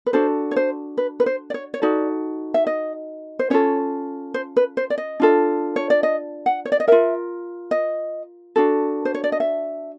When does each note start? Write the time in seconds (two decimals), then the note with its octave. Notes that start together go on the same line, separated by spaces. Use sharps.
0.06 B4
0.13 D4 F#4 A4 C5
0.51 C#5
0.56 C5
0.98 B4
1.20 B4
1.26 C5
1.50 D5
1.54 C#5
1.74 C#5
1.82 D#4 F#4 A4 D5
2.54 E5
2.67 D#5
3.39 C5
3.50 C#4 F4 A4 C#5
4.34 C5
4.57 B4
4.77 C5
4.90 D5
4.98 D#5
5.20 D4 F4 A4
5.76 C#5
5.90 D5
6.03 D#5
6.46 F#5
6.65 C#5
6.72 D5
6.80 D#5
6.88 F4 A#4 E5
7.71 D#5
8.56 D4 F#4 A4
9.05 C5
9.15 C#5
9.24 D5
9.32 D#5
9.40 E5